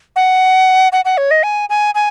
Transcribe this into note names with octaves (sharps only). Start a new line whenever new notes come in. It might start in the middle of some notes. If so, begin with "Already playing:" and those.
F#5
F#5
F#5
C#5
D#5
G#5
G#5
G#5